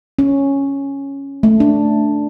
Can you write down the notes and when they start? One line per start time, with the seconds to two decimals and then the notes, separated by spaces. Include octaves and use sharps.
0.19 C#4
1.43 A3
1.60 D4